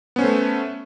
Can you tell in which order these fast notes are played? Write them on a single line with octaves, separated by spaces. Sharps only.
B3 C#4 C5 A3